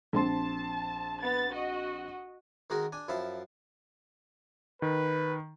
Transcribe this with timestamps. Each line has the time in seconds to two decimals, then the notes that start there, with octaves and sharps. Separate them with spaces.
0.13 A#1 C4 A5 C6
1.21 B3 A6
1.51 F#4 D#5
2.70 D#3 G#3 D#4 F#4 G#4 A#4
2.92 D4 G#5
3.08 F#2 F3 E4 E5 F5 A5
4.82 D#3 B4